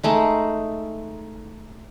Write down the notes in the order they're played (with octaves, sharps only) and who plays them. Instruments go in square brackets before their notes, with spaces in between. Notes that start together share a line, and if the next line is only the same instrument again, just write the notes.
[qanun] G#3 A3 D#4